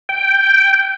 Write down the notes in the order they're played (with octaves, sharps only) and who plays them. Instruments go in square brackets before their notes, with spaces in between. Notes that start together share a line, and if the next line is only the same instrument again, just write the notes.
[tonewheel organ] G5